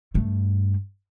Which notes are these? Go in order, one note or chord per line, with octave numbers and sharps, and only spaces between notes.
G2 A3